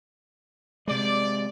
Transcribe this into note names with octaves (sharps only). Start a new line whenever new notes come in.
C3 G#3 D5